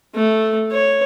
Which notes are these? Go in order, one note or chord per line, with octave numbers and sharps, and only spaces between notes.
A3
C#5